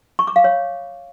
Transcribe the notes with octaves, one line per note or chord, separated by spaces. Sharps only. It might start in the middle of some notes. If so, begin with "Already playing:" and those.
C#6
D6
F5
C#5